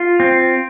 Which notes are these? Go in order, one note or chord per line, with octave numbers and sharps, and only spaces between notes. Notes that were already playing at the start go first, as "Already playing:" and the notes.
Already playing: F4
C4